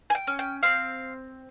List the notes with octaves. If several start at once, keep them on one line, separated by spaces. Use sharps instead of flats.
G#5
G5
C#4
G5
C4 F5